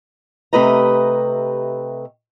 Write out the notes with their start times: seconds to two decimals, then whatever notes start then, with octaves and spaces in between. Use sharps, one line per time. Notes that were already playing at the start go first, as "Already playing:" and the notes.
0.53 C3 A3 G4 B4 D#5 A#5